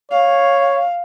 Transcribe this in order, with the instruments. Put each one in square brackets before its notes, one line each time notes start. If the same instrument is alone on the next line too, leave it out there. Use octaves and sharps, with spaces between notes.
[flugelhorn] C#5 [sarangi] F5